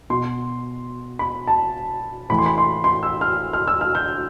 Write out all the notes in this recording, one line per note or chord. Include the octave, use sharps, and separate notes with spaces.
B2 C6
B5
A5
A2 E3 B5
C6
B5
C6
C6
E6
F6
F6
E6
F6
G6